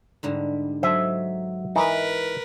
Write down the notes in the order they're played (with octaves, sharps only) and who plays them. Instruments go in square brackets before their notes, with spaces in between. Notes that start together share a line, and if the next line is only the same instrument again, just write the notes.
[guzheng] G#2 D3 G3
[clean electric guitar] F#3 E5 [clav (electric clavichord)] A4 C5 [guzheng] D#5
[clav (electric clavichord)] E3 D#4 [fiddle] A#4 B4